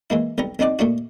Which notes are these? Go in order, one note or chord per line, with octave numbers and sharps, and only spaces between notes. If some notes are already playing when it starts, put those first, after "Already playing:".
E3 G#3 A#3 E4
B1 G3 B3 A#5
B1 C4 D4 D#4 D5 D6
A#2 A3 D4 F#4